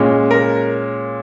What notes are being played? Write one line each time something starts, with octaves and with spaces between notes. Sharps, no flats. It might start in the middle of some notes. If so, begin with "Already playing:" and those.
Already playing: A#2 G#3 C#4
A#4